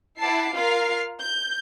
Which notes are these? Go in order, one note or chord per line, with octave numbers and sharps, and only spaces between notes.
E4 F#5 A5 D6 C7
F4 A#4 F5 F6 C7
G6